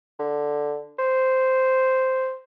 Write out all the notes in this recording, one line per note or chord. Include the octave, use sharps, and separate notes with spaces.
D3
C5